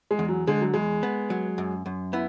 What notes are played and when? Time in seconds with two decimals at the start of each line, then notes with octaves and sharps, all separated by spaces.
0.11 G#3
0.19 E2
0.28 F#3
0.47 D3 G#3
0.61 F#3
0.74 E2 G#3
1.03 B3
1.30 F#3
1.58 F#2
1.86 F#2
2.13 B3 E4